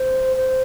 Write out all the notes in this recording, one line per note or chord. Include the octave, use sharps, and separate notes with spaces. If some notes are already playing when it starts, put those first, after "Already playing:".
Already playing: C5
C5